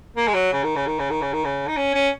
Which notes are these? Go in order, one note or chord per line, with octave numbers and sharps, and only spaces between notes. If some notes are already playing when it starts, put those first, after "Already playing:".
A#3
G#3
F#3
C#3
D#3
C#3
D#3
C#3
D#3
C#3
D#3
C#3
D#4
C#4
C#4